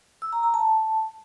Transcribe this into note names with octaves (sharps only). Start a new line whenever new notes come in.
E6
A#5
A#5
A5